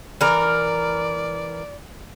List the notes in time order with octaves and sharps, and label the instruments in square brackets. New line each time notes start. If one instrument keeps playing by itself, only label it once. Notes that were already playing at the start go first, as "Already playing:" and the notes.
[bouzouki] E3 A#4 [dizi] D5